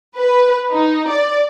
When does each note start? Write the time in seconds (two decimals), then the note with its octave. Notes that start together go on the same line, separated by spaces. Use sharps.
0.17 B4
0.72 D#4
1.10 D5